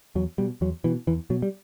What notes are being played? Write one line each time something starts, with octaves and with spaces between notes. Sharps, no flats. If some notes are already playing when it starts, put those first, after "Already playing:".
E2 F#3
B2 G3
E2 F#3
B2 E3
E2 E3
B2 F#3
G3